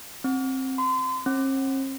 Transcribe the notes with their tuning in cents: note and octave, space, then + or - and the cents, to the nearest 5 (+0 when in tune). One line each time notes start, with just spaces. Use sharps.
C4 +15
C6 -30
C4 +45